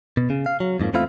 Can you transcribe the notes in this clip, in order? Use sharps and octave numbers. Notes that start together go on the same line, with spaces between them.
B2
C#3
F5
F#3
F2 G#2 F3 A#3
E2 A3 C4 E4 F4 F5